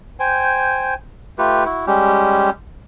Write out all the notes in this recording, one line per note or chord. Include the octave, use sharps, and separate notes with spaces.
C5 G5 G#5
A3 F4 G4 B4
E4 F#4
G3 G#3 C#4 G4